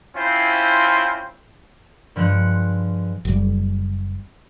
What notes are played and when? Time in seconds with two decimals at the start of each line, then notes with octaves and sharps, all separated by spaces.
0.16 C4 C#4 E4 F4 C5
2.16 G2 F3 G#3 F#6 C#7
3.25 F#1 G3